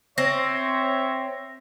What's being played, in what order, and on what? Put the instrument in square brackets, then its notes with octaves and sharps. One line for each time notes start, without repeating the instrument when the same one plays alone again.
[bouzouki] C4 [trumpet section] C5 C#5 [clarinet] E5 [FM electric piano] A#6